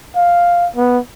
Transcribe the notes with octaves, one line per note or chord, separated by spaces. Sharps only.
F5
B3